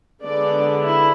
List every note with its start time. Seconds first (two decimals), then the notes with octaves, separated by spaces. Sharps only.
0.23 D3 G#3 B3 D4 D5
0.83 E4